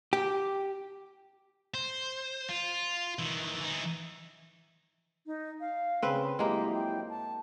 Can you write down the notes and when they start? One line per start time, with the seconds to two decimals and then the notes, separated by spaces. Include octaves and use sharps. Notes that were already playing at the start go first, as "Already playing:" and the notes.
0.13 G4
1.74 C5
2.49 F4
3.19 D#3 E3
3.61 E3 D#4
5.26 D#4
5.61 F5
6.02 C#3 C4 B4
6.39 F2 F#3 G#3 A#3 E4 G4
6.75 G5
7.10 A5